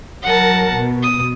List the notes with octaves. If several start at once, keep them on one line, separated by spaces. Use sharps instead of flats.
F#3 A#4 F#5 A5
B2
D#6